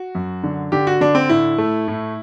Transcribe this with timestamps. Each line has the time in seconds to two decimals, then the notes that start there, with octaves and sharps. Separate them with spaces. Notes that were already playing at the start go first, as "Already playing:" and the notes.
Already playing: F#4
0.15 F#2
0.44 D3
0.72 D3 G4
0.87 F#4
1.01 D3 D4
1.15 C4
1.29 A2 E4
1.58 A3
1.88 A2